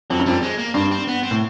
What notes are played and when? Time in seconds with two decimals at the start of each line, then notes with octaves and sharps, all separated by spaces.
0.10 F2 F#3
0.20 F#2
0.26 F2 G3
0.43 G#3
0.58 A#3
0.74 G2 C4
0.91 C4
1.08 B3
1.23 C4
1.31 A2